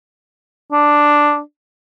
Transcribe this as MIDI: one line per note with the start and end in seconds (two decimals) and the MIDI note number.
0.72 1.40 62